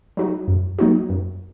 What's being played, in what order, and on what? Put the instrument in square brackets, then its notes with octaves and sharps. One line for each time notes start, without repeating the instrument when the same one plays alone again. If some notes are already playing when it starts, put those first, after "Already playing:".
[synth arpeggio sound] F#3 D#4 F#4
F#2
F#3 A#3 D#4 F#4
F#2